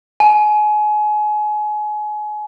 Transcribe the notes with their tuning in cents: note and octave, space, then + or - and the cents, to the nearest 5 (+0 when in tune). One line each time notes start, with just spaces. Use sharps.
G#5 +30